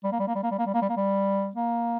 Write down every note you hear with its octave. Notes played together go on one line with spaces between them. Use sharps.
G3
A#3
G3
A#3
G3
A#3
G3
A#3
G3
A#3
G3
A#3
G3
A#3